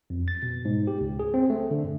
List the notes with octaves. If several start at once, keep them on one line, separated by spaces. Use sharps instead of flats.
F2
A6
B2
G#2
G4
C#2
G#4
C4
A3
D3
G2